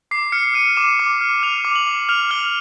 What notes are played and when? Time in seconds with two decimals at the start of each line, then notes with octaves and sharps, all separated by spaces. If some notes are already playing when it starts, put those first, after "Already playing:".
0.11 D6 C7
0.32 F6 C#7
0.54 F6 D#7
0.77 D6 E7
0.99 D6
1.21 F6
1.43 F6 F7
1.65 D6
1.76 F#7
1.87 D6
2.09 F6 F7
2.31 F6 G7